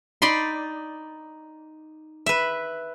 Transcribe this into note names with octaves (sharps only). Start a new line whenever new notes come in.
D#4 D5 B5 C6
B4 E5